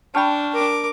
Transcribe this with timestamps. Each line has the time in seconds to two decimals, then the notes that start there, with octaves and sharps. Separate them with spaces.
0.15 D4 G5 A5 B5 C#6 F6
0.52 A#4 D6